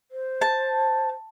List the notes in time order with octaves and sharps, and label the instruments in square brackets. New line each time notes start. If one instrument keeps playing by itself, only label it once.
[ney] C5
[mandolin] A5